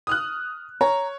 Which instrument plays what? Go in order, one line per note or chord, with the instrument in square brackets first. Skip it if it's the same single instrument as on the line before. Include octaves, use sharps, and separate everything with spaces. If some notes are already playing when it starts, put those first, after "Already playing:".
[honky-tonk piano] D#6 F6 F#6
[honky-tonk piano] C#5 [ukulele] A#5